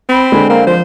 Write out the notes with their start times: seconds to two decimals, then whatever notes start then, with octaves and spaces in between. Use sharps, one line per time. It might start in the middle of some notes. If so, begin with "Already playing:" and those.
0.09 C4 B5
0.32 D3 G#3
0.50 A#3 C4
0.67 F3 C5